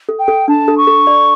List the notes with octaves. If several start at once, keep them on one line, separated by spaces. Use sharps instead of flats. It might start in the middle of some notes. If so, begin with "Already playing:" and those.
A4
G5
A4
D4 A5
A4
C#6
A4
D5